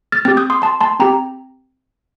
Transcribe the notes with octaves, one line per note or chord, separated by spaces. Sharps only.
F6 A6
C4 G4 F6 A6
D#6 G6
C6 D#6
A5 C6
A5 C6
C4 G4 G5 A#5